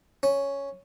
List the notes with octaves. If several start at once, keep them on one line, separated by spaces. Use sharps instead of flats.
C#4